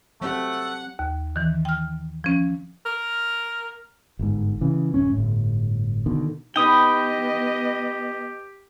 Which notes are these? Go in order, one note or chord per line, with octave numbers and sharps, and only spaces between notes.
F#3 A3 C4 G4 F#5
D#2
D#3 E3
G5 F6
F3 C#4
A#4
G1 G#2
C#3 E3
D1 F#2 C#4
G1 A2
B2 D3 D#3
B3 D#4 G4 B4 D#5 G5 D#6